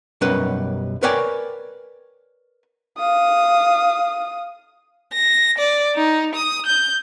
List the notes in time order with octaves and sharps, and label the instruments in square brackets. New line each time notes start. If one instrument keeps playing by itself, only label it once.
[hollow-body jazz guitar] B1 F#2 G3 C#4 A#4 B4
A#4 B4 C#5 D5 G5 G#5
[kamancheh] F5 D#6
[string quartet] A#6
D5
D#4
D#6
G6